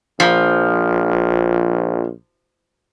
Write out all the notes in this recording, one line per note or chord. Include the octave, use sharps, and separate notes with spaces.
A#1 F3